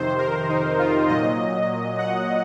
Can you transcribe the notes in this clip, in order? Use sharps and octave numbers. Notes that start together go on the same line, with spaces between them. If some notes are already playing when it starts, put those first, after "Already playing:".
Already playing: F2 C3 D#3 C5
A#4
D#4
F4
A#2 F#3 D#5
F#5